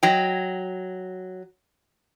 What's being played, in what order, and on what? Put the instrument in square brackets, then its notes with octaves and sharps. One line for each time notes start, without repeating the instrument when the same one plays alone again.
[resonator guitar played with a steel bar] F#3 D#5 G5